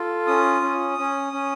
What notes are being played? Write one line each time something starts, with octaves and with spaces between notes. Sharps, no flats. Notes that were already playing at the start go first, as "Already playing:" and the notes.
Already playing: F4 A4
C#4 D#6
C#4
C#4
C#4